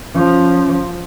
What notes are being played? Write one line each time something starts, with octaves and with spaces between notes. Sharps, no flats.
F3 C#4